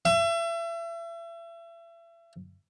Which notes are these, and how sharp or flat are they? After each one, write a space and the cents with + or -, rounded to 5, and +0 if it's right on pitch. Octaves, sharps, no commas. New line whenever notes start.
E5 +35